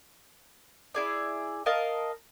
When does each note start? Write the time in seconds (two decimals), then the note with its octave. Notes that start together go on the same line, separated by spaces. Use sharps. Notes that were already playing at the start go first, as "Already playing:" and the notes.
0.95 E4 G#4 D5
1.66 A#4 D#5 F5 A5